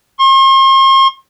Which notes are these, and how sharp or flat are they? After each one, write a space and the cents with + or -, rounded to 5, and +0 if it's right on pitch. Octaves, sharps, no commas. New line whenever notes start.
C6 +45